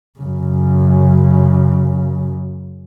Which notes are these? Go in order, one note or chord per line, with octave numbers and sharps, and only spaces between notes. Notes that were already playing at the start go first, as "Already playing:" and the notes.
F#2 C#3